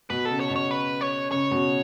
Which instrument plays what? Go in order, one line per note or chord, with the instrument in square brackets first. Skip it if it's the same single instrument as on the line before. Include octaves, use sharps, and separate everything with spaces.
[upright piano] B2 [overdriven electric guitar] B4
[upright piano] C#3 [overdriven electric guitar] A4
[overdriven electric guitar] C#5
[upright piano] B2
[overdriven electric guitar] C#5
B4
C#5
[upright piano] C#3 [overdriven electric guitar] C#5
[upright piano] B2